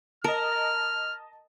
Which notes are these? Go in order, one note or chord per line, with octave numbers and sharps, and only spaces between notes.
A#4 D#5 A5 F6